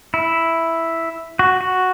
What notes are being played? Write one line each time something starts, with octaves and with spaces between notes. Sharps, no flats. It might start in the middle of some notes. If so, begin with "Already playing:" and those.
E4
F#4
F#4